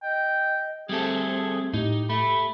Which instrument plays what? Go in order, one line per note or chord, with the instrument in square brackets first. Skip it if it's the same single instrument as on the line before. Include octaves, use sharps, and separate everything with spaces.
[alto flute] D#5 [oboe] G5
[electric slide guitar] G3 A3 A4 [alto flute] C4 [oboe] G#4
[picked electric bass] A2 [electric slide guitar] D#4 [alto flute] G4
[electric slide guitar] A3 [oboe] B5